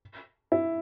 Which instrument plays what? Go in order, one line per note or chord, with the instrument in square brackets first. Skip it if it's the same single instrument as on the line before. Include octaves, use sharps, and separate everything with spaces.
[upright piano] E4